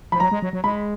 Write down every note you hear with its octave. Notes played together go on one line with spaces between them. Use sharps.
F3 B5
F#3 A#5
G#3
F#3
F#3
G#3 B5